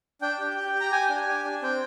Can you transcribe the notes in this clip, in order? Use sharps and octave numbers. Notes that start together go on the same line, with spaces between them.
D4 G5
G4
G4
G4
A#5
G4 G#5
D4
G4
D4
C4 G5